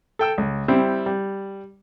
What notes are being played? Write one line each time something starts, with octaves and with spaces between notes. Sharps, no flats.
A4 G5 E6
C#2
G3 C4 E4
G3